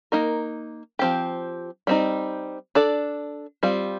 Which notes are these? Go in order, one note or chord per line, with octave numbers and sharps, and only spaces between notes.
A#3 D#4 A#4
F3 C4 G4
G3 C4 D#4
D4 A4 D5
G3 C4 F4